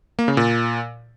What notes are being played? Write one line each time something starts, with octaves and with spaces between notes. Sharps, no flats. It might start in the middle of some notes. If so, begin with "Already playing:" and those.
A#3
C#3
A#2